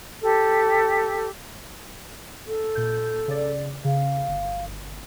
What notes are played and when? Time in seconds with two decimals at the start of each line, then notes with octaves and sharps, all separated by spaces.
0.21 G4 A4
2.47 A4
2.75 A#2 G6
3.28 C#3 D5
3.85 C#3 F5
4.28 G1